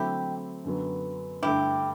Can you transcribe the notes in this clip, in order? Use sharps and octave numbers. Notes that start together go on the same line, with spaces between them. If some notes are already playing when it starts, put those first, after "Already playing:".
Already playing: D3 F#3 A3 C4 E4 G4
F#2 D3 F#3 B3
G2 D3 A3 E4 G4